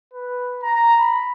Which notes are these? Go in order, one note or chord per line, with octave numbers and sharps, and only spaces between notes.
B4
A#5
B5